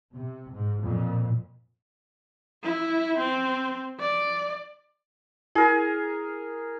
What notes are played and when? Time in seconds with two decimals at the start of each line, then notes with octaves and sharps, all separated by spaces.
0.15 C3
0.53 G#2
0.83 F2 A#2
2.63 E4
3.18 C4
4.00 D5
5.56 E4 G#4 A#4